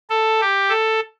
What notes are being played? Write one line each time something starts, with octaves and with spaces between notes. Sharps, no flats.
A4
G4
A4